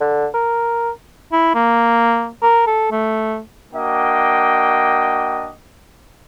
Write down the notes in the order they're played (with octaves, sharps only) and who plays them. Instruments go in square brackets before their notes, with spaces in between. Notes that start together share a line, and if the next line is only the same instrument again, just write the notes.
[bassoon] D3
A#4
[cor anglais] E4
A#3
A#4
A4
A3
[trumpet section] A#3 D4 F#4 D#5 G5